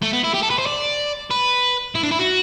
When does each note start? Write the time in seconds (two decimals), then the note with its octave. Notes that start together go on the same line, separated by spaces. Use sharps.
0.02 A3
0.13 B3
0.24 E4
0.34 G4
0.42 A4
0.50 B4
0.58 C5
0.66 D5
1.31 B4
1.95 E4
2.03 D4
2.11 E4
2.19 F#4